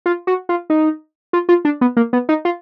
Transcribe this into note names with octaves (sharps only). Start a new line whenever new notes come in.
F4
F#4
F4
D#4
F4
F4
D4
B3
A#3
B3
D#4
F4